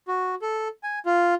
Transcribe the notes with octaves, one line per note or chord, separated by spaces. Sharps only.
F#4
A4
G#5
F4